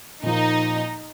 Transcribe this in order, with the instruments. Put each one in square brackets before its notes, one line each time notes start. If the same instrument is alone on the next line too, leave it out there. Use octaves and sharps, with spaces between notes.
[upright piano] A#2 F3 A#3 [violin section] D#4